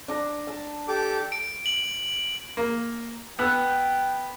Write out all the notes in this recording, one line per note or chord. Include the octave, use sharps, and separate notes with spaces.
D4 A#5
A5
G4 A4 D6
D7
F#7
A#3
B3 G5 E6 F#6